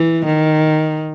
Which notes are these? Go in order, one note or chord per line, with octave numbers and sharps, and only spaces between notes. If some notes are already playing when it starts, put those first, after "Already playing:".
Already playing: E3
D#3